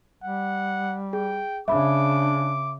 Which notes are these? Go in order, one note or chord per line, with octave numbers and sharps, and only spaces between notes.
G3 F#5
G#4 G5
C#3 D4 E5 B5 D6